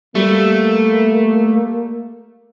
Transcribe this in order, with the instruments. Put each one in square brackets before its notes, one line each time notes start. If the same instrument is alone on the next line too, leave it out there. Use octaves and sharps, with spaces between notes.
[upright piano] G3 [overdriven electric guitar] A3 [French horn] A#3